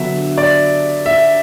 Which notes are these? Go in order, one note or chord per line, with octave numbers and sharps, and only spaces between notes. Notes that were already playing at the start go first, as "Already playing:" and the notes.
Already playing: D3 F#3 B3 D4 E5
D5
E5